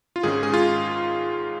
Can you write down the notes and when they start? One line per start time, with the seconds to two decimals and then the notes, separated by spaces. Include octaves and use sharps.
0.16 F4
0.23 G#2 D#3 C#4 G#4
0.43 G#4
0.54 F4